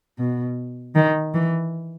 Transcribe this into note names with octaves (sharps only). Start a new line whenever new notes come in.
B2
D#3
E3